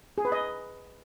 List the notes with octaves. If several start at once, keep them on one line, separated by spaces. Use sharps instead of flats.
G#4
B4
D#5